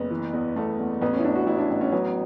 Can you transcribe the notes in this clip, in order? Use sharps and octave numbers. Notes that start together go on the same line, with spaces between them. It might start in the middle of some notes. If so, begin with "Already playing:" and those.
Already playing: F#1 B3
E3
E2
E2 A3
E2
A1 B3
C#4
E4
A1 D4
F#4
A1 E4
D4
A1
C#4
F#3 B3